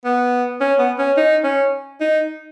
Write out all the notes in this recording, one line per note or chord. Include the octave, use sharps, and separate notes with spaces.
B3
C#4
B3
C#4
D#4
C#4
D#4